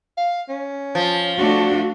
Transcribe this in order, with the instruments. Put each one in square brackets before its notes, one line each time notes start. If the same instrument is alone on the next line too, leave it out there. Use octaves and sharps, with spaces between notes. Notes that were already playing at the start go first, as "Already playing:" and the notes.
[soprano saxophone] F5
C#4
[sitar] F3
[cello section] A3 D4 F#4